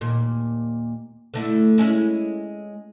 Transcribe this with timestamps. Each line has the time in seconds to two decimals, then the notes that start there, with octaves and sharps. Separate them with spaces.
0.01 D#2 A#2
1.34 D3 A3 E4
1.78 G#3 C#4 E4